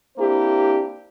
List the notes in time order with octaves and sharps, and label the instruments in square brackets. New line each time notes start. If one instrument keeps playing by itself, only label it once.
[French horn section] A#3 C4 D4 E4 G4 C5